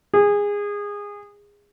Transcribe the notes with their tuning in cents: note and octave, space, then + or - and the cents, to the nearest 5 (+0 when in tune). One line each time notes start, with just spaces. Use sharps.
G#4 -20